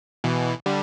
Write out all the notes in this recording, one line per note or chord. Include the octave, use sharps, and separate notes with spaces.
B2 E3
D3 G3